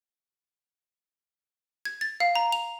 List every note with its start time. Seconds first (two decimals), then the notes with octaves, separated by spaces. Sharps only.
1.85 G#6
2.01 A6
2.20 F5
2.35 A#5
2.52 F7